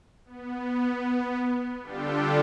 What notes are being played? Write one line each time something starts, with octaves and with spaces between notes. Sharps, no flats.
B3
D3 G3 D4 F4 G4 A4